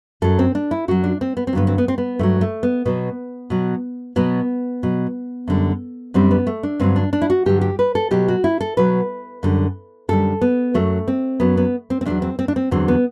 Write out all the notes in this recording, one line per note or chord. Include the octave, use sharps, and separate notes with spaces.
F#2 F#3 A4
C4
D4
E4
F#2 F#3 F#4
D4
C4
B3
C4
G2 D3 F#3 B3
C4
B3
C4
B3
G2 D3 F#3 A3
A3
B3
B2 F#3 B3
B2 F#3
B2 F#3 B3
B2 F#3
F#2 D3 G3
F#2 D3 G3 C4
B3
A3
D4
G2 D3 F#3 C4
D4
D4
E4
F#4
G2 D3 F#3 G4
G4
B4
A4
B2 F#3 G4
F#4
E4
A4
B2 F#3 B4
F#2 D3 G3
F#2 D3 G3 A4
B3
F#2 F#3 A3
C4
F#2 F#3 B3
B3
C4
C4
E2 D3 F#3 D4
C4
C4
D4
C4
E2 D3 F#3 C4
B3